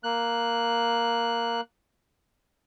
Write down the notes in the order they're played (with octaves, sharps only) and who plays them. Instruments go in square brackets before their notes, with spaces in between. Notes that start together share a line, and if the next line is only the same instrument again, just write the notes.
[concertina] A#3 F#6